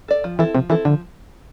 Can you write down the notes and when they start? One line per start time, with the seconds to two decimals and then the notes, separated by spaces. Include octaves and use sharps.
0.08 A4 D5
0.24 F3
0.39 E3 C4 E4 A4
0.55 C3 F3
0.69 E3 C4 E4 A4
0.85 D3 F3